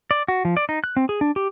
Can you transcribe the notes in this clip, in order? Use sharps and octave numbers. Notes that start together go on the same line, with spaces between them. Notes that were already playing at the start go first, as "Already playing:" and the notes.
D5
F#4
F3
D5
D#4
F#6
C4
G#4
D4
G4